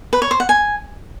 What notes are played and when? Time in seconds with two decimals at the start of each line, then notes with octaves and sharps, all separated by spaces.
0.13 B4
0.22 C#5
0.31 C5
0.40 F#5
0.49 G#5